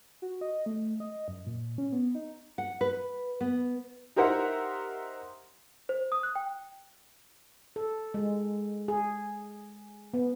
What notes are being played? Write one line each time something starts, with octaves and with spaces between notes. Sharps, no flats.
F#4
D#5
A3
D#5
F#2
A#2
C#4
B3
D#4
F#5
B4
B3
D#4 G4 A#4 C5 E5 F#5
C5
D#6
F#6
G5
A4
G#3
G#4
B3